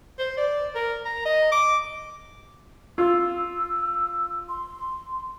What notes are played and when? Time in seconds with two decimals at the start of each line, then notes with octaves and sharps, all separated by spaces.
0.19 C5
0.37 D5
0.75 A#4
1.05 A#5
1.25 D#5
1.52 D6
2.98 F4 E6
4.49 C6